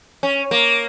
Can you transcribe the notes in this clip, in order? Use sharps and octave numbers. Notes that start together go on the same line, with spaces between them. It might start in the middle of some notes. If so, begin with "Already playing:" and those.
C#4
A#3